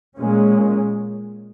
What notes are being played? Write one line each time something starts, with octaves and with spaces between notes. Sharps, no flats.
A#2 G#3 C#4